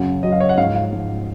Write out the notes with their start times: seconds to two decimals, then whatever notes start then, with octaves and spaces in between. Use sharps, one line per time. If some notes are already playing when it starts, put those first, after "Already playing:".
Already playing: F#2 C#3 F#3
0.23 F#2 C#3 F#3 D#5
0.32 F5
0.40 C#5
0.49 F#5
0.57 G#2 F3 F5
0.75 F5
0.92 G#2 F3